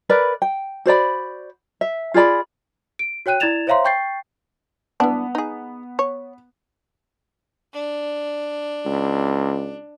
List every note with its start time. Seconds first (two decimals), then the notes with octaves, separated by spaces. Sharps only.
0.09 A#4 B4 D5 B5
0.42 G5
0.86 F#4 C5 D5 B5
1.81 E5
2.14 F4 G#4 D5 B5
2.99 D7
3.26 F#4 C#5 G5 F#6 D#7
3.40 E4 D5 G#6 A6 E7 F7
3.67 C5 C#5 E5 F5 A#5 C6
3.85 G5 C#6 G6 A6 C7
5.00 E3 B3 D4
5.35 D#4 G#4
5.99 C#5
7.74 D4
8.86 C#2